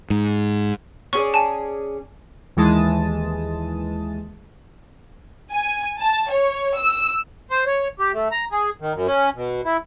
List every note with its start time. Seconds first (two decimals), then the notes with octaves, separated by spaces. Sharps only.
0.10 G#2
1.13 C#4 G#4 D5 C#6
1.34 G#5 A5
2.57 D#2 E3 G#3 A5 D#6
5.52 G#5
6.00 A5
6.31 C#5
6.78 E6
7.50 C5
7.66 C#5
7.99 G4
8.14 A3
8.32 A#5
8.52 G#4
8.81 D#3
8.94 F#2
9.07 C#4
9.35 B2
9.65 E4